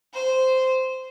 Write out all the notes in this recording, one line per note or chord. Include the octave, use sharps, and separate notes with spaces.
C5